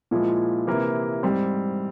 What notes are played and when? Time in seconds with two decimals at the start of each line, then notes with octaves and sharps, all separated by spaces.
0.11 A#2 F3 G#3 E4
0.67 C3 E3 A#3 E4 A#4
1.23 G#2 G3 C4